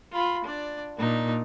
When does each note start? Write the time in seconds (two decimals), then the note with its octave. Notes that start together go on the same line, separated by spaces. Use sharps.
0.12 F4 B5
0.44 D4 D5
0.98 A#2 D4 D#4